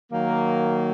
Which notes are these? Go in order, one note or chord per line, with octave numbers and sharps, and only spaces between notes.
D#3 F#3 A#3